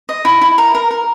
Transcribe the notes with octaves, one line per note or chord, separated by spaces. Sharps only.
D#5
E4
E4
A#4
A#4
A#4